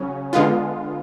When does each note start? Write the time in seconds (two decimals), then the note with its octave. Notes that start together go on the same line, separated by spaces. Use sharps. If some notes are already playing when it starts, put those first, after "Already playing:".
Already playing: C#3 F#3 C#4
0.33 D3 G#3 B3 F4